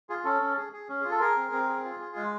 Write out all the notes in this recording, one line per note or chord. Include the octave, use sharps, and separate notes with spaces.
F4 G#4
C#4 A4
C#4
G#4
G#4
C#4
F4 G#4
A4
G#4 A#4
C4
C4
G#4
F4
G#4
G#3